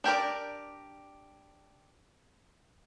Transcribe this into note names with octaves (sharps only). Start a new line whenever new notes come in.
D4 G4 A#4 D5